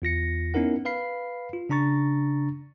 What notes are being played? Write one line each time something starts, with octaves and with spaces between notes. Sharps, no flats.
E2 F4 A#6 C#7
B3 C#4 D#4 E4 A#4 F#5
B4 F5 B5 C7
F4
C#3 D4 A#5 C#6 A6